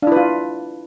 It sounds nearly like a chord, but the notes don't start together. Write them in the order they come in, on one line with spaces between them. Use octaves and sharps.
D4 E4 B4 F4